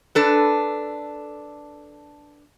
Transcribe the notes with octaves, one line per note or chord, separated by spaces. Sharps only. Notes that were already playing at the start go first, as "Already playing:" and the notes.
D4 A4 B4